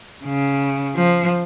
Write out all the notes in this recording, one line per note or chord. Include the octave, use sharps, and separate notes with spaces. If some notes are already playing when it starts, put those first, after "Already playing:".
C#3
F3